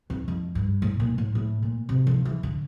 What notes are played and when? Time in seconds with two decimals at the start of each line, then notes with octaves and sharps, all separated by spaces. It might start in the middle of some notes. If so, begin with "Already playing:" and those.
0.10 F2
0.28 F2
0.55 G2
0.82 A2
1.00 A#2
1.18 A2
1.35 A2
1.62 A#2
1.89 C3
2.07 F3
2.25 E3
2.43 D3